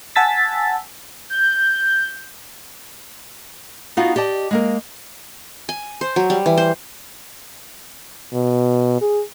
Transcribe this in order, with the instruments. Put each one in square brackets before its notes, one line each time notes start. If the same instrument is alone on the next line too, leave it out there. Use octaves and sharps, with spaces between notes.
[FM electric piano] F#5 G#5 A5 E6 A6 B6
[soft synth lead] G6
[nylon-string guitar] B3 D#4 F4 F#4
G4 D5 D#5 A5
G#3 A#3 A#4
[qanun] G#5
C5
F#3
G3
E3
C5
[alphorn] B2
G#4